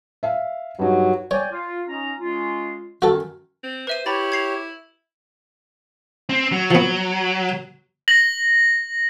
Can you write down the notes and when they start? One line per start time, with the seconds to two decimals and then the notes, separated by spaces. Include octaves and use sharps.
0.23 E5 F5
0.79 G2 F#3 D#4
1.31 C#5 D5 G5 G#5
1.51 F4
1.87 C#4 D#4 A#5
2.19 G#3 C#4 F4
3.02 F#2 D#3 F#4 A4
3.63 C4
3.87 B4 C5 E5 D#7
4.06 E4 G4 C#5 A#5 B5 A6
4.32 G#6 C7 F7
6.29 C4
6.52 F#3
6.71 F3 B3
8.08 A#6 F#7